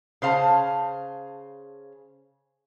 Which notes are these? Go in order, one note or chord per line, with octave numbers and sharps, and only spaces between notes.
C#3 C5 F5 A5